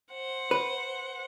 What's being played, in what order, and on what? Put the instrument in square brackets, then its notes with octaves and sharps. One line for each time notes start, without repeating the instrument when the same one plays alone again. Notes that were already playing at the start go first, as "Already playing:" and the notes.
[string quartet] C5 F#5
[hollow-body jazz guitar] B4